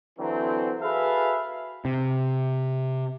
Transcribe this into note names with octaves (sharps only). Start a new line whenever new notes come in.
D3 E3 F#3 C4
F#4 G#4 A4 B4 E5 F5
C3